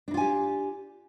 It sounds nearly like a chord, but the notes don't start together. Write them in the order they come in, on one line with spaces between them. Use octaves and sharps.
D4 D#4 F4 G#5 G4